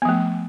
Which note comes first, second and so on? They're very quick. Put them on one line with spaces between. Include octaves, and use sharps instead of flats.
B3 F3 A3